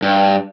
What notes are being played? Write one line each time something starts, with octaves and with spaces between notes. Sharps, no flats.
G2